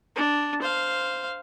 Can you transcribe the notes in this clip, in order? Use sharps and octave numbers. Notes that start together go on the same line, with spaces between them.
D4
C5 F5